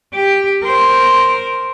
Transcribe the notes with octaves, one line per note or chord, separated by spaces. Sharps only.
G4
A#4 C5